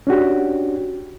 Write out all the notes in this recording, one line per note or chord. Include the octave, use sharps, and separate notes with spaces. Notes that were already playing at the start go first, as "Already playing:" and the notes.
C#4 D4 F#4 G4